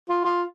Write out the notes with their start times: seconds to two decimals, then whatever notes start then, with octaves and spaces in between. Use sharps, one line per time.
0.09 F4
0.25 F4